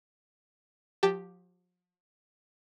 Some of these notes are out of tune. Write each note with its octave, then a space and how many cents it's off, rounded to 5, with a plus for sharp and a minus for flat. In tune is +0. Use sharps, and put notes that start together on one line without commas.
F3 +40 G4 +0 A5 +0